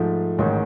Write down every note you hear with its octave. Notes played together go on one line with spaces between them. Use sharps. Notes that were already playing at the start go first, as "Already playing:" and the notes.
Already playing: G#2 F3 A3
A1 G#2 D#3